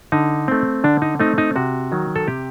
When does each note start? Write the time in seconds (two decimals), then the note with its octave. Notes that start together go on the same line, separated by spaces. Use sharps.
0.12 D3 D#4
0.48 A3 C4
0.84 D3 D4
1.02 D#4
1.20 A3 C4 D#4
1.38 D#4
1.56 C3 F#4
1.92 D#3 F#3
2.16 A4
2.27 C3 G4